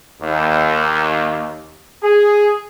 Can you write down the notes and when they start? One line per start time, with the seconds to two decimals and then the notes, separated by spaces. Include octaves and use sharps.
0.21 D#2
2.02 G#4